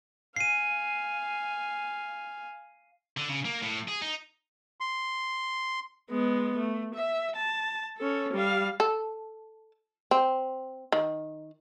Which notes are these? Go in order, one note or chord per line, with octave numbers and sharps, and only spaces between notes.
F5 G#5 C7 D#7
D3
C#3
A#3
A2
G#4
D#4
C6
G#3 B3
A3
E5
A5
C#4 A4
G3 F5
A4
C4
D#3